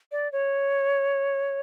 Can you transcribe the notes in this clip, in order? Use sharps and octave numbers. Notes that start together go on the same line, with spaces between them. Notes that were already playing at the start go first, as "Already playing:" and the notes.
D5
C#5